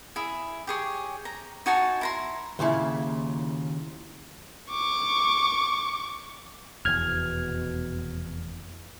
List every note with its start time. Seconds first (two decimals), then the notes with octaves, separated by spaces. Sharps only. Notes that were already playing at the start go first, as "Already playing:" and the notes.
0.16 E4 G#4
0.67 G4 G#4 C#5
1.25 A#5
1.66 D#4 F#4 G#5 A5
2.01 E4 A#5 C6
2.59 D#2 A#2 C#3 E4
4.71 C#6 D6
6.85 F1 E2 B2 F6 G#6